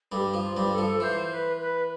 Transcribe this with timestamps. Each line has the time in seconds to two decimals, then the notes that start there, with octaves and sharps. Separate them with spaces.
0.12 G2 G3 A4
0.16 G4
0.34 F3
0.42 F4
0.57 G2 G3
0.72 A4
0.78 F3
1.00 E3 C5
1.31 B4
1.60 B4